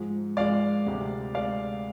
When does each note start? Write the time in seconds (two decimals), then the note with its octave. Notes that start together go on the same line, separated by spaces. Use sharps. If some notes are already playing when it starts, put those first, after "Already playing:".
Already playing: G#2 F3 G#3
0.37 G#2 F3 G#3 D5 F5
0.86 D2 C3 G#3
1.35 C3 G#3 D5 F5